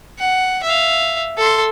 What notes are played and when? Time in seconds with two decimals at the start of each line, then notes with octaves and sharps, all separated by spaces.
0.19 F#5
0.63 E5 F5
1.38 A4 C6